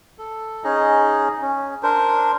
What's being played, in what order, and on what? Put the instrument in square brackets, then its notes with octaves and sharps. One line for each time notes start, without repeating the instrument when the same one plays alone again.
[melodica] A4
C#4 D#4 G#4 D#5
C#4
D4 A#4 C5